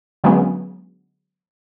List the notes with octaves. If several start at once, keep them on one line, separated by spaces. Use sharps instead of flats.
D3 F#3 G#3 A#3 B3 C#4